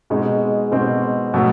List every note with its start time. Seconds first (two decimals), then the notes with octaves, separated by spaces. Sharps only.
0.10 B2 G#3 C4 D#4
0.72 B2 G#3 C4 D#4
1.34 B2 F#3 A3